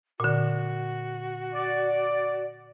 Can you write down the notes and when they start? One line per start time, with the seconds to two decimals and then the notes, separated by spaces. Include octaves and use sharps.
0.20 A#2 D3 F#4
1.54 D5